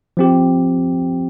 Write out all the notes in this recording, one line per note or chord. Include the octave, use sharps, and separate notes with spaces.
F3 C4 G4